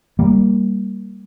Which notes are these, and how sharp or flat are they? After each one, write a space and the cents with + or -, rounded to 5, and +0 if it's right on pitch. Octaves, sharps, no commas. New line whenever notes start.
G3 +0 A#3 +0